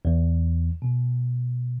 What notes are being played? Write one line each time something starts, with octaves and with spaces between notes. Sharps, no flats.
E2
B2